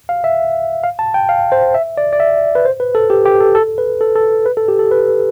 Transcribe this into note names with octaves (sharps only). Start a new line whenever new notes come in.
F5
E5
F5
A5
G5
F5
C5
E5
D5
D5
E5
B4
C5
B4
A4
G4
G4
A4
A4
B4
A4
A4
B4
A4
G4
A4
B4